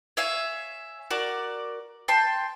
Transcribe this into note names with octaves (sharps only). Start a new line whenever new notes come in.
C#5 E5 F5 G#5
F#4 A#4 D5
G5 A5 C6